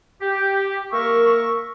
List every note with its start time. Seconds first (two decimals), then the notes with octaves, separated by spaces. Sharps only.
0.21 G4
0.92 A#3 A#4 E5 C#6